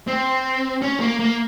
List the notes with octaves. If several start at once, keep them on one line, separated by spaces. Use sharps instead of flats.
C4
C#4
A#3
A#3